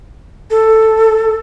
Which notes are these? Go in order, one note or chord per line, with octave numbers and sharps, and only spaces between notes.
A4